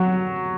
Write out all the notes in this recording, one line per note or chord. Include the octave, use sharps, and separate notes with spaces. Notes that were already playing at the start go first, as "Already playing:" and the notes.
Already playing: F#3